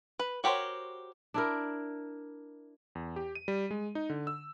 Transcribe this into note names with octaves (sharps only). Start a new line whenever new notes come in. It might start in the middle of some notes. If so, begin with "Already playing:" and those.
B4
F#4 G4 A#4 C5 C#5
D4 E4 A#4
E2
G4
D#7
G3
G#3
D#4
D3
E6